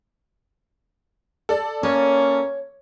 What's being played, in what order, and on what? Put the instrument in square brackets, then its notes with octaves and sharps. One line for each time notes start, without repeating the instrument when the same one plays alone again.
[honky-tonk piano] A4 D5
[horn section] A#3 C#4 [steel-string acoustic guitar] C#5